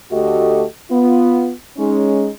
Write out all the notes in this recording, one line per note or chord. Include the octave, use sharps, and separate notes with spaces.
D2 A3 F#4 G4 A4 D#5
B3 F4
G#3 C#4 D#4